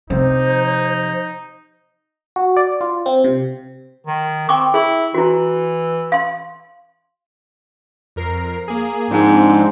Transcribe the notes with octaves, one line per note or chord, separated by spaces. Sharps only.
C3 F3 C4 D#4 C5
F#4
D5
F4
C4
C3
D#3
C4 G5 C#6 D6
E4 G#4
E3 E4 F#4
F5 C6
F2 A#4 C7
A#3 G#4
G#2 F3 C4 D4